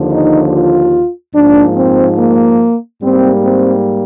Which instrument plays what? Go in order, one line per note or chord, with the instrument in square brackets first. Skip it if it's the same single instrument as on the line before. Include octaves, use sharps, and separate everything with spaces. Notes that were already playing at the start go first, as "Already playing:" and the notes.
Already playing: [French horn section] D#2 D3 F3
D#4
F4
G#2 F3 A#3 D4
C4
A#3
G#2 G3 A#3 C4
C4